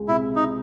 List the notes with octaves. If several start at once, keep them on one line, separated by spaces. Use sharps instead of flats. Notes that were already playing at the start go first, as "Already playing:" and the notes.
Already playing: C#2 G#3
C3 E4
D#4